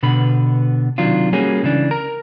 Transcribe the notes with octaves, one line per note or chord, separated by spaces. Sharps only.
B2 D3 B3 B5
C3 D#3 F#3 D4 F4
G3 A#3 C#4 F#4 G#4
C#2 C#3 E3 D4
A#4 A#5